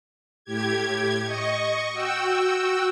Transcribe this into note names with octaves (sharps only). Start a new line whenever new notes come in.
A2 G4 G#6
D#5 C#6
F#4 G5 E6